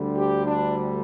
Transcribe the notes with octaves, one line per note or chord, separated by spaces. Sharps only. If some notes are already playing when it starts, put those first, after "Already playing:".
Already playing: D2 D3 G3
G4
D4